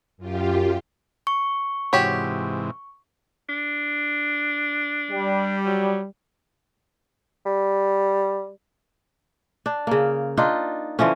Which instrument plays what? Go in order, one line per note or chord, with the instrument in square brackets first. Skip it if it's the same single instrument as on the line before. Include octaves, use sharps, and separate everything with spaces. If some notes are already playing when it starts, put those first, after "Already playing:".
[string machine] F#2 F4 G4
[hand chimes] C#6
[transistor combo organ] G#2 C3 E3 [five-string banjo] F#4 G4 C#5
[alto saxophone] D4
[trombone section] G3
[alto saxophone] F#3
[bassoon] G3
[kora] D4
C#3 A#3
D4 D#4 F4
D3 E3 F3 C#4